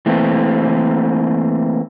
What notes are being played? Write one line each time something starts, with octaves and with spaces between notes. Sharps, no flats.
E3 A3 A#3 C4